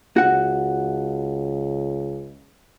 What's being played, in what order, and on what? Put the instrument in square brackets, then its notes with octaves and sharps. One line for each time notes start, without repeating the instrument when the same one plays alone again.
[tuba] C#2 [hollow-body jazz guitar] F#4 F#5